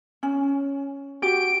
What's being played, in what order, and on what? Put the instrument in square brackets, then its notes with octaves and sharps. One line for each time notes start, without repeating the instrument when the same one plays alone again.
[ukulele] C#4
[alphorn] F#4 [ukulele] G4 [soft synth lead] D7